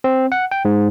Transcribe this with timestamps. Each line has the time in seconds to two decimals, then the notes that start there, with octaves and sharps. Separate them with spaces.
0.04 C4
0.32 F#5
0.51 G5
0.65 G#2